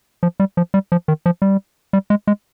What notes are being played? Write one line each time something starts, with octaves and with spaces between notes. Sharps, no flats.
F3
G3
F3
G3
F3
D#3
F3
G3
G3
G#3
G#3